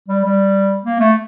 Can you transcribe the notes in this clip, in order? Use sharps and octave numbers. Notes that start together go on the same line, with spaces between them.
G3
G3
A#3
A3